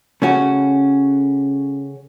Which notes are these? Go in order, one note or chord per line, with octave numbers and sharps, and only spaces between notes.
C#3 A3 C#4 F#4